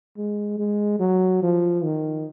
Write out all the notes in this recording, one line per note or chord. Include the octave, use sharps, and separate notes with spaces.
G#3
G#3
F#3
F3
D#3